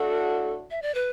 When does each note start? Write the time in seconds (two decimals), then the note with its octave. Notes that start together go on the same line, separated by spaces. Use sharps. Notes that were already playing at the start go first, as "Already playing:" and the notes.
Already playing: A2 A3 D4 F#4 A4
0.71 E5
0.82 D5
0.95 B4